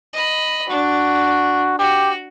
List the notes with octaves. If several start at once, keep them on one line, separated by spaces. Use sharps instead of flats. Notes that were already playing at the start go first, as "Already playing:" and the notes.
D#5 B5
D4 F#4
F#4 G4